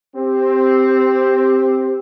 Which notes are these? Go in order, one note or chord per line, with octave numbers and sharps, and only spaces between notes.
C4 G4